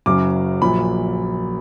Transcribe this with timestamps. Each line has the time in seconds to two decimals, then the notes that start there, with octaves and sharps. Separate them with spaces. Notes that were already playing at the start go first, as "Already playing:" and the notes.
0.06 F#1 F#2 C#3 F#3 D6
0.62 A#1 A#2 F#3 B5